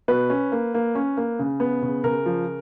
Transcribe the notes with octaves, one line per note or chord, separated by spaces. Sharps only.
B2 B4
C#4
A#3
A#3
C#4
A#3
C#3
B3
C#3
C#3 A#4
F3